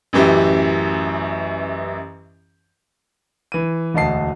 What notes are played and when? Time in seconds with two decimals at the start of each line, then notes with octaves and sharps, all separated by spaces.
0.13 A1 F#2 E3 G4
3.52 E3 D#7
3.94 E1 D2 D#5 A5 C7